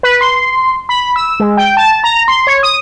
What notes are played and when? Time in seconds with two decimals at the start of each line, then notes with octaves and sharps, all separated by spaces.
0.03 B4
0.21 C6
0.89 B5
1.16 E6
1.40 G#3
1.57 G5
1.77 A5
2.04 A#5
2.28 C6
2.47 C#5
2.63 D#6